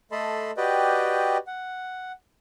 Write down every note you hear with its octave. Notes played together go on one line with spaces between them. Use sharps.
A3 A4 D#5 A5 B5 C6
F#4 G4 B4 D5 D#5 G5
F#5